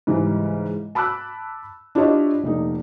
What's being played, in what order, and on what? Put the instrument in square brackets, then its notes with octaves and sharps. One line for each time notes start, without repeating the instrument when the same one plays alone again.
[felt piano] G#2 C#3 E3 G3 G#3
A5 B5 D6 E6 F#6
D4 E4 F4 G4 C#5 D#5
F1 A#2 D#4